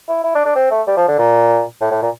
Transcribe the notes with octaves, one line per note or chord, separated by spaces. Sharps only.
E4
E4
D4
D4
C4
A3
G3
F3
D3
A#2
A2
A2
A#2